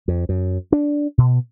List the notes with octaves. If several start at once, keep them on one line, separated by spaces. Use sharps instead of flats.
F2
F#2
D4
B2